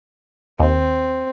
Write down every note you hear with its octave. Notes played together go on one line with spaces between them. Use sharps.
D#2 C4